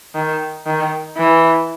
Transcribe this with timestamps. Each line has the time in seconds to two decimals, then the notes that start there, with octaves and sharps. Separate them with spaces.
0.15 D#3
0.66 D#3
1.17 E3